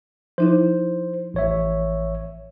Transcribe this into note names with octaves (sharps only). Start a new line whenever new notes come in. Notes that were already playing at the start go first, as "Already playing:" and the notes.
F3 D#4 E4 C5
A1 C#5 E5